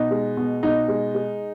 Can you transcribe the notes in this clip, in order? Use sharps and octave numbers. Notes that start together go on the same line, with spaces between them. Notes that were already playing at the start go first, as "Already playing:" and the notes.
Already playing: B2 D#4
G#3
B2
B2 D#4
G#3
G#3